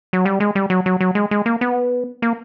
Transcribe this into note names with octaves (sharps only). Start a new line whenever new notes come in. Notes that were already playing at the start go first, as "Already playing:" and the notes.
F#3
G3
G#3
G3
F#3
F#3
F#3
G#3
G#3
A#3
B3
A#3